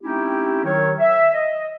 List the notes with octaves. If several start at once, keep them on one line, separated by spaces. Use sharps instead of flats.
A3 C4 C#4 D#4 E4 G4
D#3 F#3 C#5
E5
D#5